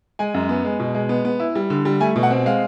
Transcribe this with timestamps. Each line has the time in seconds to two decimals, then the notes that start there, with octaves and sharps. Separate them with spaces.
0.19 G#3 G#5
0.34 F#2
0.49 B3
0.65 G#3
0.79 B2
0.95 G#3
1.09 B3
1.25 B3
1.40 E4
1.55 G3
1.70 D3
1.85 G3
2.00 A3 G#5
2.16 B2
2.23 F#5
2.30 C4
2.46 G#3 F5